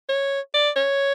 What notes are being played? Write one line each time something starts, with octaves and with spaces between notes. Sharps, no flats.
C#5
D5
C#5